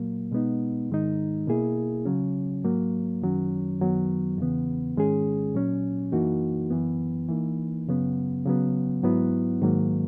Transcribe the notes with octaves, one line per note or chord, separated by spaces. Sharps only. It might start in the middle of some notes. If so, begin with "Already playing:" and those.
Already playing: A#2 F#3 A#3
B2 G#3 B3 D#4
G#2 D#3 G#3 D#4
B2 A#3 E4 G#4
C#3 F#3 C#4
G#2 F#3 A#3
F#2 D#3 F#3 C#4
F#2 D#3 F#3 B3
E2 C#3 E3 B3
G#2 D#3 G#3 C#4 G#4
A#2 F#3 C#4
F#2 E3 A#3 D#4 F#4
F#2 E3 B3
E3 A#3 D#4
F#2 C#3 F#3 B3
C#3 F#3 B3
G#2 F#3 B3 E4
G#2 D#3 F#3 A#3